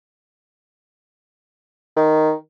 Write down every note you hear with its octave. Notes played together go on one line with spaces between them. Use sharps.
D#3